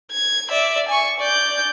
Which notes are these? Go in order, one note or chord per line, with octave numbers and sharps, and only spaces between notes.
G#6
D5 E5
G#5 C#6
D5 G6